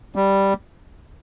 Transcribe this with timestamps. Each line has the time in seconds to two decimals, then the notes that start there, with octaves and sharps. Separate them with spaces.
0.16 G3